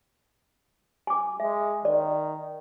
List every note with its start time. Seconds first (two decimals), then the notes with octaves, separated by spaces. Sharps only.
1.07 G#5 D6
1.40 G#3 E5
1.85 D#3 D5